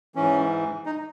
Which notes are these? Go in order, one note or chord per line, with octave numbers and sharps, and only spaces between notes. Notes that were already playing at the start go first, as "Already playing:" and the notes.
G#2 E3 C#4
D#4